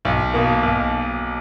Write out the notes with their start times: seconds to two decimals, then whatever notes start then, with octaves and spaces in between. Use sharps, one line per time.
0.05 B1
0.34 B2 A#3
0.63 B1